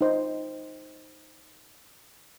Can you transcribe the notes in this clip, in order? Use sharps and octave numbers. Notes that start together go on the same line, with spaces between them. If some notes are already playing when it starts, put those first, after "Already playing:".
D#4 C5